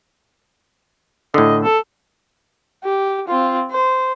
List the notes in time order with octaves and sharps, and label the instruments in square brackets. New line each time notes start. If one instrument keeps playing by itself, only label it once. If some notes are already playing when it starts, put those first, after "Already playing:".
[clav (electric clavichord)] A2 D3 [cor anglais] D#5
[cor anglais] A4
[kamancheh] G4
C4 F4
C5